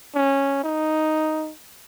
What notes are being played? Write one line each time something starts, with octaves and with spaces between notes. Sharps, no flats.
C#4
D#4